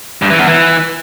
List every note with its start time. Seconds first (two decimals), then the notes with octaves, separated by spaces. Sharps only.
0.22 G2
0.30 E3
0.39 E2
0.47 E3